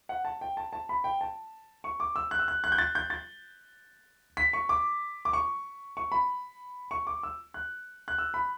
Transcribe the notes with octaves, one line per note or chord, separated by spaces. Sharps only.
F#5
A5
G5
A5
A5
B5
G5
A5
C#6
D6
E6
F#6
E6
F#6
F#6
G6
A6
G6
A6
B6
C#6
D6
D6
C#6
C#6
B5
C#6
D6
E6
F#6
F#6
E6
B5